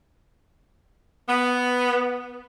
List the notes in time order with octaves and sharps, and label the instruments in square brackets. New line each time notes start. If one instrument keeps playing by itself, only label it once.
[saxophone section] B3